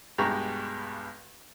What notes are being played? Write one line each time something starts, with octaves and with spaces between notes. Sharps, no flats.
B1 G2 G#3 G4 A#5 C#6